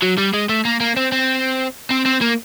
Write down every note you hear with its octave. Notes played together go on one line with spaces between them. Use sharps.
F#3
G3
G#3
A3
A#3
A#3
C4
C4
C4
C4
A#3